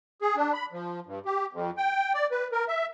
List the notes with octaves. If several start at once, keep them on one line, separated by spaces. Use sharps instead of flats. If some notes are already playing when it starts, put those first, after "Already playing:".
G#4
D4
B5
F3
G2
G4
F2
G5
D5
B4
A#4
E5